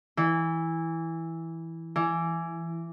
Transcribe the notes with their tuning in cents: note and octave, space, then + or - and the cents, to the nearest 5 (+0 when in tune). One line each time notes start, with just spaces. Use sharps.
E3 -5
E3 +20